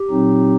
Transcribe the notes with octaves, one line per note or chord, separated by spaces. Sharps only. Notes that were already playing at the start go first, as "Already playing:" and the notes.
Already playing: G4
A#2 F#3 C4 D#4